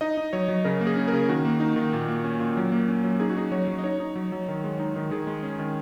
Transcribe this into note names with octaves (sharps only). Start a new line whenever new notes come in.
D#4 D#5
D#4
F#3 C#5
F#3
C#3 A#4
A#3
G#4
C#4
A#4
C#3
D#3 F#4
A#3
D#4
D#3
A#2
A#3
C#4
A#2
F#3
A#3
C#4
F#3
D#4 G#4
F#4
D#4 G#4
F#3 C#5
F#3
D#5
D#4 C#5
D#4
F#3
F#3
D#3
G#3
D#4
D#3
D#3 G#4
G#3
C#4
D#3